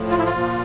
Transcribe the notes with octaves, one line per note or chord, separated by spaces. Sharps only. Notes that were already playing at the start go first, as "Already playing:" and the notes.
Already playing: A2 F3
F4
E4
F4
A#2 F3